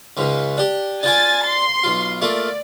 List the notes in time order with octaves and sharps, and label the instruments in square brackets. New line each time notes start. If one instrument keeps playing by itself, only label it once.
[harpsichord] C#2 G#2 C#3
D4 G4
[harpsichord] D4 F4 D6 [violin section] G#5 A6
[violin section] C6
[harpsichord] B1 F4
[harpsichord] A3 A#3 F4 [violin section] D5